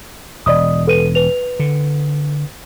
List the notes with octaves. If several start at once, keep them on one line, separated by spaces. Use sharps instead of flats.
E1 D5 D#5 D#6
A4 B4 D#7
B4 F7
D3